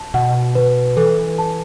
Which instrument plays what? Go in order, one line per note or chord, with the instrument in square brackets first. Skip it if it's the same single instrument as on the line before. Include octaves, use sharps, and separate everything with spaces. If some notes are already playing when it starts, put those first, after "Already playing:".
Already playing: [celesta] A5
[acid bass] B2 [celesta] F#5
[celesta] B4
[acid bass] E3 [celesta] A4
[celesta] A5